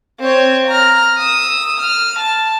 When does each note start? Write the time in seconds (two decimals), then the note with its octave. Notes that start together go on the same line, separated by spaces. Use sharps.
0.20 C4 C#5
0.68 A#5 F6
1.17 D#6 E6
1.79 F6
2.19 A5